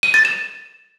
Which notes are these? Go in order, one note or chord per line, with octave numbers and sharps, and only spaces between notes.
D#7
A6
E7